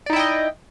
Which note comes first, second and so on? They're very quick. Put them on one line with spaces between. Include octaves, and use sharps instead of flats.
D5 D#4 E4 G5 D#5